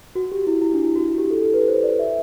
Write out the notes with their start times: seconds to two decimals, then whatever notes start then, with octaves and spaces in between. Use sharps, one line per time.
0.15 F#4
0.32 G4
0.47 E4
0.62 E4
0.74 D4
0.84 E4
0.96 F#4
1.08 E4
1.18 G4
1.31 A4
1.42 A4
1.54 B4
1.68 C5
1.83 D5
1.99 E5